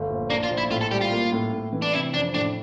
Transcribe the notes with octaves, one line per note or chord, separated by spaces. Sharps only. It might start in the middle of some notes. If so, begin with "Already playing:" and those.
Already playing: G1 A3
A#1
A#3 D4
F4
A#1
E4
A2 F4
A4
G3 G4
F4
A#3
A2
A2
E3
D4
C3 E4
F2 D4
A2 D4